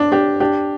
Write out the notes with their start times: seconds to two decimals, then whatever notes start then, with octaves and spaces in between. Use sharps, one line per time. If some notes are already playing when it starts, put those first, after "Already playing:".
Already playing: D4
0.12 D4 G4
0.40 D4 G4